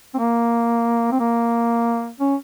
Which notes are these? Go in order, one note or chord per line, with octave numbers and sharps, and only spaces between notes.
C4
A#3
C4
A#3
C#4